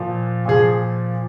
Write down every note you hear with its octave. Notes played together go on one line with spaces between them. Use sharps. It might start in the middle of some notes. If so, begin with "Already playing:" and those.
Already playing: A#2 F3
A#2 F3 G#4